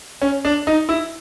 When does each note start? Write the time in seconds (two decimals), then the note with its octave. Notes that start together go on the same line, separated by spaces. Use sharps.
0.22 C#4
0.45 D4
0.67 D#4
0.89 E4